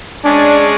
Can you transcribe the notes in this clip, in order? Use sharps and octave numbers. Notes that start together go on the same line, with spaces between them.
G#3 C#4 D4 G#4 D5